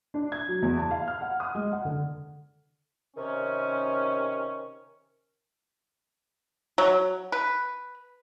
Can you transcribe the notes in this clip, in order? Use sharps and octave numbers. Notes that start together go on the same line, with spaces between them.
D4
G#6
F#3
E2
A5
F5
F6
F#5
D#6
G#3
F#5
D3
C3 D#3 C#4
F#3
B4